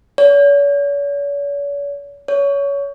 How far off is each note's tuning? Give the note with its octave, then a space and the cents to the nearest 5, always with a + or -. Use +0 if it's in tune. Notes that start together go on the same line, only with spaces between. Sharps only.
C#5 +45
C#5 +20